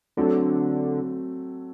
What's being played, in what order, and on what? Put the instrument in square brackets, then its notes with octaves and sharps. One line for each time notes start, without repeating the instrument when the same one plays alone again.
[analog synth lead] D3 [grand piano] F#3 A3 C4